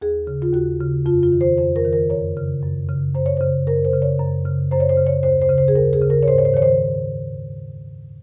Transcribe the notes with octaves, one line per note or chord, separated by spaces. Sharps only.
D#2 G#4
C#3
F4
D#2 F#4
C#3
F2 F4
F4
D#3
C5
F2 C5
A#4
D#3
A#4
F#2 C#5
C#3
F#2
C#3
F#2 C5
C#5
C#3 C5
F#2 A#4
C5
C#3
C#5
F#2
C#3
F#2 C5
C#5
C5
C#3
C#5
D#2 C5
C5
C#3
C5
G#4
D#2 A#4
G#4
C#3
A#4
C#5
G#2 C5
C#5
C5
D#3 C#5
C5